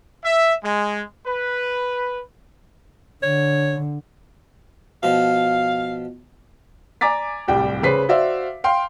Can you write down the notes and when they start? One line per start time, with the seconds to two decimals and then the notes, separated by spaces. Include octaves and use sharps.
0.24 E5
0.63 G#3
1.26 B4
3.23 D3 C#5
5.03 B2 F3 F5
7.01 D5 G#5 A#5 D6 A6 B6
7.48 D1 C2 G3 G5
7.83 C#3 B4 C5 B6 C7
8.09 F#4 C5 D5 E5 F5
8.64 F5 G5 C6